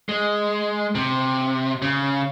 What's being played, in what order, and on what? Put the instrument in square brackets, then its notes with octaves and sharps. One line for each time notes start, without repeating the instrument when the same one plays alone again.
[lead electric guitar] G#3
C3
C#3